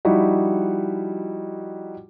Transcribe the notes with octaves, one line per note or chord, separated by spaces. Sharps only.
F3 G3 D#4 E4 F#4